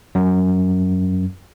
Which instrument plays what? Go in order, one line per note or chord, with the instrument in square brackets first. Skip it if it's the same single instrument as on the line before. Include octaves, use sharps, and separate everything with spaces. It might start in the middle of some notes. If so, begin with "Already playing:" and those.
[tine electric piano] F#2